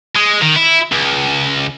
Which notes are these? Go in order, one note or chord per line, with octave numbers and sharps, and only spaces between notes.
G#3
D#3
E4
C#2